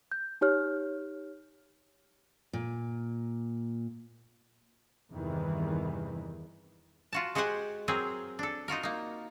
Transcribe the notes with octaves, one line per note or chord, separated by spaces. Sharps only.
G6
D#4 G4 C#5 F6
A#2
E2 G2 C3 D#3 E3
F4 F#4 A5
G#3 F#4 G4 C5 F#5 G#5
F#3 C4 G#4 A#4
D4 A4
D#4 F4 F#4 A#4
A#3 D#4